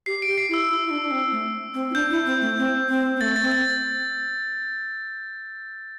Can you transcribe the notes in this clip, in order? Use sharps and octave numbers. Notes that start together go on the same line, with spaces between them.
G4 C7
G4 D7
C7
E4
E6
E4
E4
D4
D4
C4
A3
C4
E4
D4 G6
E4
C4
A3
C4
C4
C4
A3 A6
A6
C4
A6